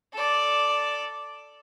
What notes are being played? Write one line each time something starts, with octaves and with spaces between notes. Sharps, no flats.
A4 D5